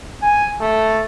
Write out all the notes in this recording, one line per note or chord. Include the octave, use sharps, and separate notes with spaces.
G#5
A3